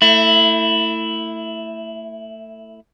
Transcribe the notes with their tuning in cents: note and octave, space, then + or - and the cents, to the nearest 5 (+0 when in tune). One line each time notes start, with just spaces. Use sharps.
A3 +25 E4 +0